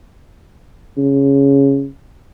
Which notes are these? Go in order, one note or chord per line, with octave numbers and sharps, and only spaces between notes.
C#3